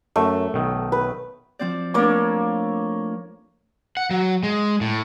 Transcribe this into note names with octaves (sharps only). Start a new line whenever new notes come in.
F#2 A3
B1 D#3
B4
F3 C4 D5
A3 A#3 D4 C#5 D6
F#5
F#3
G#3
A2